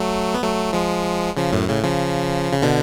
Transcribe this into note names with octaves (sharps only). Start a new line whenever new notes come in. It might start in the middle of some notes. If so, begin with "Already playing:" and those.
Already playing: F#3 A3
B3
F#3 A3
F3 G#3
C#3 F3
F#2 A2
A2 C#3
C#3 F3
C#3
B2 D3